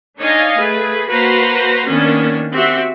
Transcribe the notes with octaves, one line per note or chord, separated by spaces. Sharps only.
D4 D#4 C#5 D#5 F5 G#5
A3 G#4 B4
A#3 F#4 B4 C5 A#5 C6
D#3 A#3 B3 C#4 D4
C4 F#4 G4 E5 F#5